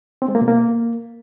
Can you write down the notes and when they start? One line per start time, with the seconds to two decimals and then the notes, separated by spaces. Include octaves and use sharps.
0.22 C4
0.28 G#3
0.35 A#3
0.41 B2
0.48 A#3